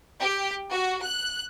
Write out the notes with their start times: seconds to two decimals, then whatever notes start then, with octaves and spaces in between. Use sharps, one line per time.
0.21 G4
0.71 F#4
1.02 F#6